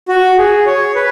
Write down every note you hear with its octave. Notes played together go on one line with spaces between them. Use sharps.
F#4
G#4
C#5
B4